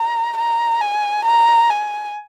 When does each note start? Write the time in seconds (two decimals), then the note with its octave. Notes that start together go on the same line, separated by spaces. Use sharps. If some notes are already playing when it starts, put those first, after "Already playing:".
Already playing: A#5
0.37 A#5
0.81 G#5
1.25 A#5
1.70 G#5